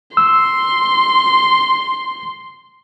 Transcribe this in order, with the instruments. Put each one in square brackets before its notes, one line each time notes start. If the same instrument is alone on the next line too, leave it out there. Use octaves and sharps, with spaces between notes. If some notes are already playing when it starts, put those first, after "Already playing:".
[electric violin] C6 [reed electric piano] E6